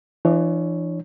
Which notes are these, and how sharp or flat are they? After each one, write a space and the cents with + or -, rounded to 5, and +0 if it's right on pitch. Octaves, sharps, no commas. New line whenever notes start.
E3 +35 D4 +40 C#5 +0